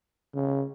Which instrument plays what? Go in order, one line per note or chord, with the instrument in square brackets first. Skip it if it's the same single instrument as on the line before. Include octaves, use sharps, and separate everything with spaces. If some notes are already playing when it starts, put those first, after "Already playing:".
[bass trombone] C#3